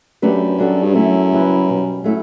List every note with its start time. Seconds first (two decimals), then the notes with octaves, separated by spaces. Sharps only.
0.22 F#2 A3 D4 G4 B4
0.58 G3 D4 F#4 A4 C#5
0.84 G2
0.95 F#2 A3 E4 A4 C#5
1.32 C#3 G3 B3 E4 B4
1.68 B2 G3 C#4
2.04 F#3 A3 C#4 E4